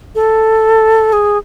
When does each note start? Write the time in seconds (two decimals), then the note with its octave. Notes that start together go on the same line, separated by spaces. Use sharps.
0.15 A4
1.13 G#4